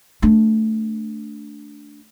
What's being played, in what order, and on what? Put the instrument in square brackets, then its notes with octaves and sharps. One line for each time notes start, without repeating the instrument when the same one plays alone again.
[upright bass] A3 D4